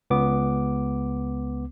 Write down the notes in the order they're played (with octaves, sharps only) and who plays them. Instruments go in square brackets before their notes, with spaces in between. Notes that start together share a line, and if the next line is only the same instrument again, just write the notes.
[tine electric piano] C#2 B3 D6